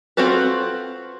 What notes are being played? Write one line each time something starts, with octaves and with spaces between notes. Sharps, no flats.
C4 F4 F#4 A4 B4